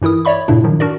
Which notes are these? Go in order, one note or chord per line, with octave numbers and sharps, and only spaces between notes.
G2 E3 E4 A#4 D#6
C#5 D5 E5 B5 C#6
G2 A#2 C#3 A3 D4 E4
A2 D#3 F3 F#3
D4 F#4 A#4 D5